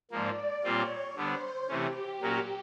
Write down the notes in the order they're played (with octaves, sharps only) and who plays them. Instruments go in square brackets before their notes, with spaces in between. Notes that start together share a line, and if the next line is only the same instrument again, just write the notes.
[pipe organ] G#2 F3 A#3 [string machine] D5
[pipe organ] A#2 G3 C4 F4 [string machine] C#5
[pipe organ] D3 G3 B3 D4 [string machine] C5
[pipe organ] C3 E3 A3 C#4 [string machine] G4
[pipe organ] A#2 F#3 A#3 C#4 F#4